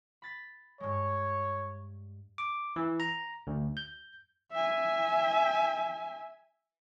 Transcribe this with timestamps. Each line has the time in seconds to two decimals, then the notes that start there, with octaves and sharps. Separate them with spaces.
0.22 B5 A6 B6
0.80 G2 G#3 C#5
2.38 D6
2.76 E3
3.00 A#5
3.47 D2
3.77 G6
4.52 E5 G#5